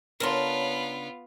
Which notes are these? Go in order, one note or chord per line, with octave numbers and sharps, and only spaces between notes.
C#3 B3 D4 F4 A#4 C#5 A5 C6